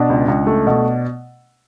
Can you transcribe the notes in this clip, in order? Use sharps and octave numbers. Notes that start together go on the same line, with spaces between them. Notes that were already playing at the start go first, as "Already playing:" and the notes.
Already playing: B2 D4
C#2
C#2
A3
B2